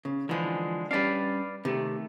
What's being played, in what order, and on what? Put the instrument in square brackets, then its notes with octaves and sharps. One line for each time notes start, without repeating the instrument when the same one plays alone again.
[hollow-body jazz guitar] C#3
[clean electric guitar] D3 G#3 [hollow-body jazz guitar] E3 F3
[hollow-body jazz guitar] G3 C#4 D4 [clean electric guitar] B4 D5 F5
[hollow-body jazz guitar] C3 [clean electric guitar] D#3 A3